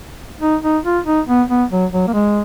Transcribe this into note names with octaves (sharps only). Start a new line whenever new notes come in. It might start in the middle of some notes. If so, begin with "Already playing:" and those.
D#4
D#4
F4
D#4
B3
B3
F#3
F#3
A#3
G#3